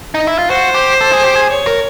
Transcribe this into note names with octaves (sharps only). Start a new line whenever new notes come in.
D#4
E4
F4
F#4 C5
G4
A4
G#4
G4
G#4
C#5
A#4